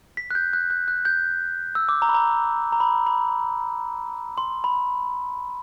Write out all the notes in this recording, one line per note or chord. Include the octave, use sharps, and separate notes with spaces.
B6
F#6
G6
F#6
F#6
F#6
G6
E6
D6
A#5
B5
A#5
A#5
B5
B5
C6
B5